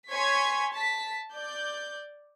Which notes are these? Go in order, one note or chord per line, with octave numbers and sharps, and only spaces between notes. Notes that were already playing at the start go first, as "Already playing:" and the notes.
C#5 G#5 C6 C#6 G#6 B6
A5 B6
D5 G6